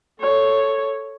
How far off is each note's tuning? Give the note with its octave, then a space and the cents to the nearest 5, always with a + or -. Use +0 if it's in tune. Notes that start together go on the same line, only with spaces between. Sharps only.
A4 +0 C#5 +0